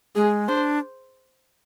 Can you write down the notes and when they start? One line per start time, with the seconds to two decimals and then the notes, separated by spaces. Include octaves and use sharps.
0.16 G#3 G#4
0.48 D4 C5